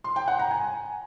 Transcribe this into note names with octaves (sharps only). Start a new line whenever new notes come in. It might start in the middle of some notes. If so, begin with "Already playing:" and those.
C6
G5
F#5
A#5
G#5